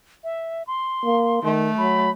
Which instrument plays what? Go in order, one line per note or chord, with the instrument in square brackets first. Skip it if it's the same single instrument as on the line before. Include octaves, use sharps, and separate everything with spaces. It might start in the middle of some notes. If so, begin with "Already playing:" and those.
[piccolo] E5
C6
[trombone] A#3
[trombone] D#3 [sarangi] A3
[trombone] F#3 [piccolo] B5